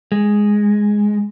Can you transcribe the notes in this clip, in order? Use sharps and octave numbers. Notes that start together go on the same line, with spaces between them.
G#3